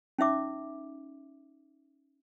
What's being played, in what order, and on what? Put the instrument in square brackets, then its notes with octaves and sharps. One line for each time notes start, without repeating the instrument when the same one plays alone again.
[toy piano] C#4 D#4 E5 D6